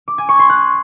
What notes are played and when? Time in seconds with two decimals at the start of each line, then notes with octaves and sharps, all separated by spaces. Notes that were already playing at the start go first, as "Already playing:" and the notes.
0.08 D6
0.18 G#5
0.29 C#6
0.39 C6
0.50 F#6